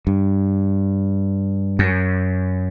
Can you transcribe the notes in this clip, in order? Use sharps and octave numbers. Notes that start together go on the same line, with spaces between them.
G2
F#2